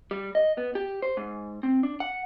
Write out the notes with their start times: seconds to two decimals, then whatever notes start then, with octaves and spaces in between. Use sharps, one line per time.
0.11 G3
0.35 D#5
0.58 B3
0.75 G4
1.02 C5
1.17 G#2
1.63 C4
1.83 D4
2.00 F#5